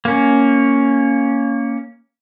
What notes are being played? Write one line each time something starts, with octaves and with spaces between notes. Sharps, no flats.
A#3 C#4